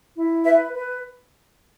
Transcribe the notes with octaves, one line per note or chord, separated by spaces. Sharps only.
E4
B4 E5
B4